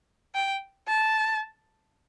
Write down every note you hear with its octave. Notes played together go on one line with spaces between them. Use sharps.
G5
A5